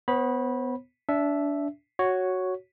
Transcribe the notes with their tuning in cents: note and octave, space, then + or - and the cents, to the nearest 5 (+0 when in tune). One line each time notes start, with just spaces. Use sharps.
B3 +15 C5 +45 B5 -15
D4 -25 E5 +0
F#4 +0 C#5 +0